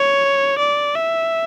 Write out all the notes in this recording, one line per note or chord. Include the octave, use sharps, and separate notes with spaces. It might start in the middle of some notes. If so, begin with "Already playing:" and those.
Already playing: C#5
D5
E5